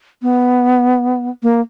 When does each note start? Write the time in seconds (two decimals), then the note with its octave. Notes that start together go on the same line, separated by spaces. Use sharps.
0.22 B3
1.43 A#3